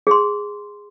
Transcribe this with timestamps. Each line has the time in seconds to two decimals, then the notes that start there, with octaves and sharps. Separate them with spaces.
0.07 G#4 C6